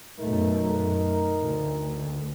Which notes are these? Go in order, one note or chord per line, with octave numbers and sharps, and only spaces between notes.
F#2 B2 A3 D#4 A#4
D2